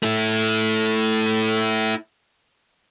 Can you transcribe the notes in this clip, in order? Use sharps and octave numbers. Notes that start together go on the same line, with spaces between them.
A3 E4